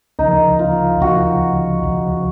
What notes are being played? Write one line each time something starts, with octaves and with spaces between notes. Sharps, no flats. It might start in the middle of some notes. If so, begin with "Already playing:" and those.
D2 C#3 F3 D#4
F4
D2 C#3 F3 F#4
D2 C#3 F3